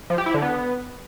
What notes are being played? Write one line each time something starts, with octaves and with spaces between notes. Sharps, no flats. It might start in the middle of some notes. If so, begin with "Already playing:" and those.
F3
G4
E4
D3
B3